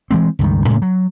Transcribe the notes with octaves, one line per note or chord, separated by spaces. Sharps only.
E3 G#3 C4
C#2 G2 D#3
A2 C#3 G#3 A#3
F#3